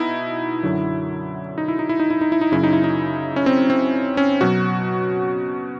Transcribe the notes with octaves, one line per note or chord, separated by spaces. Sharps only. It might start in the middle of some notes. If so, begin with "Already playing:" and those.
Already playing: B2 D#4 E4
F#2 D3 F#3
D#4
E4
D#4
E4
D#4
E4
D#4
E4
D#4
F#2 C#3 F#3 E4
D#4
E4
D#4
C#4
C4
C4
C#4
B2 F#3 F#4